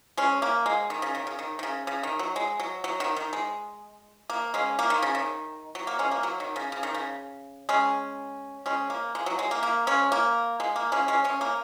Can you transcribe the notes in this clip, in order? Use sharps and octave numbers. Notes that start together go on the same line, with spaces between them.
G#3 C#4
A#3
G#3
D#3
C#3
D#3
C#3
D#3
D#3
C#3
C#3
D#3
F#3
G#3
F#3
F#3
D#3
D#3
G#3
A#3
G#3 C#4
A#3
D#3
C#3
D#3
F#3
A#3
G#3 C#4
A#3
F#3
D#3
C#3
C#3
D#3
C#3
G#3 C#4
G#3 C#4
A#3
G#3
F#3
G#3
A#3
A#3
G#3 C#4
A#3
G#3
A#3
G#3 C#4
G#3 C#4
G#3 C#4
A#3